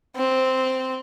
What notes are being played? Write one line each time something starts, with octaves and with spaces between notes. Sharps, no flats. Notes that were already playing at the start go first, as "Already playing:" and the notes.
C4